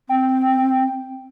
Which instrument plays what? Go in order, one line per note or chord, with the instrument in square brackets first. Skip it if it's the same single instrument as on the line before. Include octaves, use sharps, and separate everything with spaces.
[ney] C4 [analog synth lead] G5